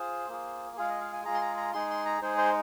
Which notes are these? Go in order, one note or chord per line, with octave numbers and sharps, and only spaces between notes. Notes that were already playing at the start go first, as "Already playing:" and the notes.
Already playing: F4 G#4 C5
A#3 F4 G#4
G#3 F4 G#4 F5
D#5
F5
G#5
G#3 F4 G#4 A#5
C6
A#5
A#5
G#3 D#4 G#4 C6
C6
A#5
G#3 D#4 G#4 C5
C5